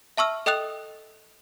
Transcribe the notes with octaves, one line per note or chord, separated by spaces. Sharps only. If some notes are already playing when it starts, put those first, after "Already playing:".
E5 A5 C#6 E6 F6
A4 D#5 G5 D#6 F#6 F7